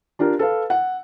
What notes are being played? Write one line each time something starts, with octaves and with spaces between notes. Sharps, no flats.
D4 F4 G4 A#4
A4 B4 F5
F#5